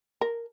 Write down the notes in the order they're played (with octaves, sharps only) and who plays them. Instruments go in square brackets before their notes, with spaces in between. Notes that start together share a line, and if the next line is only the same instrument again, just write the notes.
[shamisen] A#4